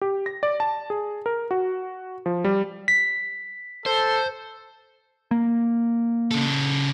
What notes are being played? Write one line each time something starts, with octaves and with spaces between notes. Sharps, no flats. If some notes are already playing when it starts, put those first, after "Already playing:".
G4
A#6
D5
A5
G#4
A#4
F#4
F3
G3
B6
A4 C5
A#3
C#3 A4